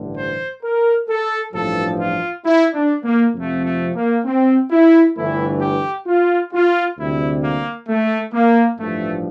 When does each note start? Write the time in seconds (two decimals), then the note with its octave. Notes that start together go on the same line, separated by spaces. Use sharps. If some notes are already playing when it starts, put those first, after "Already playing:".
Already playing: A1 G2 D3
0.17 C5
0.63 A#4
1.08 A4
1.53 A1 G2 F3 A4
1.99 F4
2.44 E4
2.74 D4
3.05 A#3
3.34 F2 C3 F3 A3
3.65 A3
3.96 A#3
4.25 C4
4.71 E4
5.16 G1 G2 E3 A3 E4
5.61 G4
6.06 F4
6.53 F4
6.97 D2 C3 G3 E4
7.42 A#3
7.88 A3
8.33 A#3
8.79 A1 G2 F3 A3